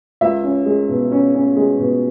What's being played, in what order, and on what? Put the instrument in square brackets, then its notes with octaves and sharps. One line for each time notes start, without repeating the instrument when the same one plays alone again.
[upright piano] C#2 E5
C#4
G#3
B2
C#4
C#4
G#3
B2